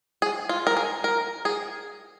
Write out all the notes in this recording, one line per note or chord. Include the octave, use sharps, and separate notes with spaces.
G#4
F4
A#4
G#4
A#4
G#4